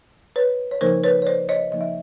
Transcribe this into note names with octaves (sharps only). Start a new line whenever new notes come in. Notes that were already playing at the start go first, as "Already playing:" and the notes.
B4 C#5
C#5
C#3 F3 A#3 D#4 A#4 C5
B4 C#5
C#5
C5 D5
C#5 D#5
C#3 F3 A#3 D#4 D#5
E5